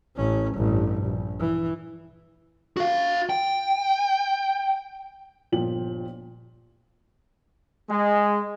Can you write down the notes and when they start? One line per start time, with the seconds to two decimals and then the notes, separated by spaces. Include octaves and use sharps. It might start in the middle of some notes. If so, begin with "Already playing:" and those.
0.17 A1 C#4
0.55 A1 G2
1.03 A#1
1.40 E3
2.77 F#4 F5
3.30 G5
5.52 G1 A#2 F3 G5 F#7
7.89 G#3